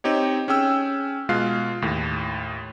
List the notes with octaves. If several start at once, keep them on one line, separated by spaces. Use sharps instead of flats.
C4 D#4 G4 C#5
C#4 G#4 G5 E6
B2 G#3 F4 F5 F#6 C7
D#2 A2